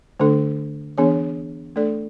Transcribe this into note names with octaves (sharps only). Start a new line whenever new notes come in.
D3 A3 D4 A4
E3 B3 D4 G#4 C#5
A3 D4 A4 D5